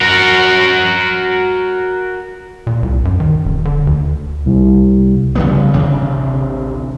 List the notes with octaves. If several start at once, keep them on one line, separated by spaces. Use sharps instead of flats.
F#4 A#4
A#2
C2
F#2
D#3
D#1
D3
D2
C2
C#3 G3 B3
A1 D2 C3 D4